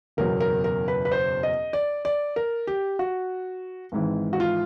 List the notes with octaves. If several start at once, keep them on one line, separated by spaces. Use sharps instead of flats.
F#1 E2 B2 F#3 A#4
A#4
A#4
B4
B4
C5
D#5
D5
D5
A#4
G4
F#4
G#1 G#2 E3
F#4
F4